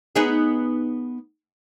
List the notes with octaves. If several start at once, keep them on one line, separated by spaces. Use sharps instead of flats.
B3 D#4 G#4